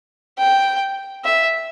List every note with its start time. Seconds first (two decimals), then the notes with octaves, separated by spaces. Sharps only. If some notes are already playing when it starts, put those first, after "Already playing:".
0.38 G5
1.24 E5